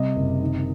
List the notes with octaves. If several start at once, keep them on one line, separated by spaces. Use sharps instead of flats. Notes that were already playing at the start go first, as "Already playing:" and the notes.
Already playing: C3 G3 D#5
F#1
D#3